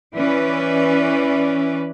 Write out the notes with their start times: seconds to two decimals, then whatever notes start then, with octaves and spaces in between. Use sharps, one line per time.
0.14 E3 C#4 B4 D5